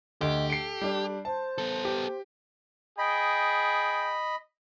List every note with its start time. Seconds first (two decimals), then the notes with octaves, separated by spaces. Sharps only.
0.21 D2 G4 D#5
0.50 A4 C7 D7
0.81 G3 D4
1.25 C5 A5
1.58 B3 A4
1.85 G4
2.98 G#4 D#5 G5 B5